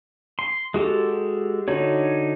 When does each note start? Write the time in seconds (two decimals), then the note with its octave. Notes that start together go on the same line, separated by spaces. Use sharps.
0.39 C6
0.74 G#3 F#4 G4 A4
1.68 D3 D#4 F#4 C#5